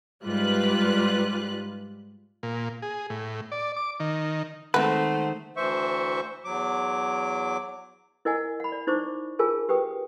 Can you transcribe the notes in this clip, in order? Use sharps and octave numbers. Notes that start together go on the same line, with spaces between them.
G#2 G3 F4 B4 F#6
A#2
G#4
A2
D5
D6
D#3
D#3 G#3 A3 C4 B4 C5 F#5
D2 E3 C5 E5 C#6
E2 F#3 D6
E4 A#4 D#5 F#5 G#5
F#5 B5
D5
D#4 E4 C5 C#6 D6
F4 G#4 A#4 G#5 A5
G4 B4 G5 D#6